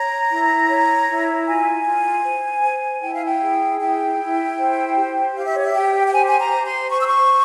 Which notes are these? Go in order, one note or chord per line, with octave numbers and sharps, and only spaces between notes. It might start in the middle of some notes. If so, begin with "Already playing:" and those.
Already playing: C#5 A#5
E4
C#5
E4
F4 G#5
F4
C5
C5
E4 G5
F5
G5
G#4
E4 G5
E4
C5
G4
G4 F5
E5
C#5
E5
G4 G5
G5
C5 G#5
G#5
A#5
C5
C6
C5 C#6
E6
C#6